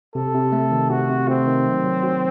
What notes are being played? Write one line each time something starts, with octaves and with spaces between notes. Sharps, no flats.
C3 A4
C3
A3
D#3
C3 F#4
C3
A3 C4
D#3
F#3
F#3
F#4